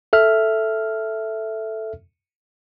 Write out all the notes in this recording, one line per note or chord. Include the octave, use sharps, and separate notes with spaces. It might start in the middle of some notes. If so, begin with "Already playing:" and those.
A4 E5 F6